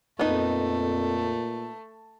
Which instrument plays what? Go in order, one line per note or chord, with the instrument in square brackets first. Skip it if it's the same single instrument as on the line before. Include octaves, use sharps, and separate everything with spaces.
[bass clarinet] F2 [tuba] A#2 [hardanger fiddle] A3 [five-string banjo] B3 D#4